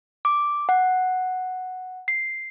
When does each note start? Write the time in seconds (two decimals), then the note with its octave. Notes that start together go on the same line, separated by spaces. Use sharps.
0.25 D6
0.69 F#5
2.08 C7